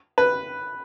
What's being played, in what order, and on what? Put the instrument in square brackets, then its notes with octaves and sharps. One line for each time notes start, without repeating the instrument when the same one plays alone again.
[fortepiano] B4